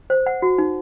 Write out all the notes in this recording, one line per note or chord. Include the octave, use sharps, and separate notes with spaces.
C5
F#5
F#4
D#4